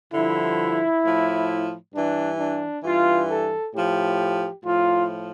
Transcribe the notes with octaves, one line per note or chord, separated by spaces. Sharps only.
G2 D3 F3 E4
A2 F3
G2 E3 D4
D4
G2 E3 F4
A4
A2 F3 G4
A2 F3 F4